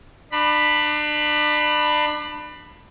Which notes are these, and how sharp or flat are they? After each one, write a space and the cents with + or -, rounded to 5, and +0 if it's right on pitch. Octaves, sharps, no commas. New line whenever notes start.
D4 +35 B5 +0